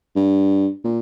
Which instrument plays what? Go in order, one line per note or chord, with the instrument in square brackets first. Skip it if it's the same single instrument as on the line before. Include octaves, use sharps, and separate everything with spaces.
[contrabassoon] G2
A#2